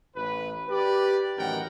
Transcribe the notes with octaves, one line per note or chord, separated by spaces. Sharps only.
A1 B4
G4 B4 D5
A1 F#2 D#3 A#4 F#5 G5